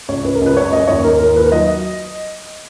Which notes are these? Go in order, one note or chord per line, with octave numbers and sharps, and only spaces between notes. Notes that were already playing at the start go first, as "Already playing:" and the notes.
C#2 C#5
C#2 B4
A#4
C#2 B4
F#2 C#5
F#2 D#5
D#2 C#5
D#2 A#4
D#2 A#4
D#2 B4
F#3 D#5